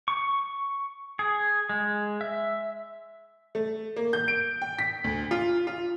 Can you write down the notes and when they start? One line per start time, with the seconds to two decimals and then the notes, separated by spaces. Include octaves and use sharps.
0.08 C#6
1.19 G#4
1.69 G#3
2.21 E5
3.55 A3
3.96 A#3
4.13 G6
4.28 D7
4.62 G5
4.79 B6
5.04 D2
5.31 F4
5.67 F4